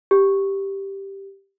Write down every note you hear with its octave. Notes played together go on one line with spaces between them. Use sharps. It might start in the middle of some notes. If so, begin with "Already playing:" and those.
G4